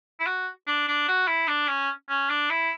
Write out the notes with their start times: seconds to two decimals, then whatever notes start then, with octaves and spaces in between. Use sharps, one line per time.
0.20 E4
0.27 F#4
0.67 D4
0.88 D4
1.08 F#4
1.28 E4
1.48 D4
1.68 C#4
2.09 C#4
2.30 D4
2.50 E4